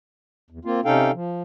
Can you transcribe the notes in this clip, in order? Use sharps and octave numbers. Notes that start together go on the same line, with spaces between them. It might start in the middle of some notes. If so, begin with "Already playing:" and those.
E2
A#3 C4 F4
C3 C#4 D#4 A4 F5 G5
F3